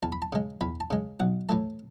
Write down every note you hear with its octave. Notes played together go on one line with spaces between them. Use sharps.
E2 A5
B5
A5
C#3 G#3
E2 B5
A5
C#3 G#3
B1 F#5
A2 E3 A3 A5